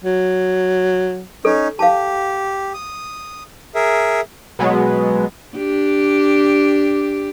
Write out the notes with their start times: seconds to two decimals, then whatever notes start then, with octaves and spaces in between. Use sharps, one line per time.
0.05 F#3
1.45 C#4 D#4 A4
1.79 G4 F5 A5
2.74 D#6
3.75 G#4 A#4 E5
4.59 B2 F#3 G#3 B3
5.56 D4 G4